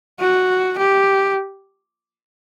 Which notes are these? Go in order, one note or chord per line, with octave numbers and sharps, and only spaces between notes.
F#4
G4